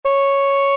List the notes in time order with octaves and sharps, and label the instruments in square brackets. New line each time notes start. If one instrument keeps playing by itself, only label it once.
[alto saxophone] C#5